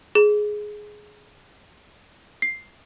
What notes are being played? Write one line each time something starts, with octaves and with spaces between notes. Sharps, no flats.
G#4
C7